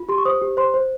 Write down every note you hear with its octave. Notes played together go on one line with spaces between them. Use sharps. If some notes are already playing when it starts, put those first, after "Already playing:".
Already playing: F4
G4 C6
C#6
C5 D#6
G4
C5 C6
C5